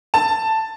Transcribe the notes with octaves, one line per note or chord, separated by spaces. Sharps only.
A5